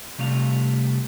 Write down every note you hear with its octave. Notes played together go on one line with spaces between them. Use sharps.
C3 G3 A3 F5